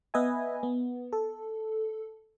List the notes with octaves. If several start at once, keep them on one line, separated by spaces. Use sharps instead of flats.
B3 B4 D#5 E5 G#5
B3
A4